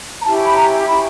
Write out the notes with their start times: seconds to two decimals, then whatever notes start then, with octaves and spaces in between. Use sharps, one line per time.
0.20 A#5
0.24 C#4 E4 G4 A5
0.44 B5
0.55 A#5
0.86 C#4 E4 G4 B5